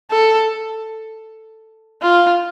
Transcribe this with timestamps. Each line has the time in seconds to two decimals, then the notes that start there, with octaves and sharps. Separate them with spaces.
0.11 A4
2.02 F4